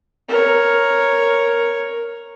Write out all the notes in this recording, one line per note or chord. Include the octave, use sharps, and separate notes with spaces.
A#4 C#5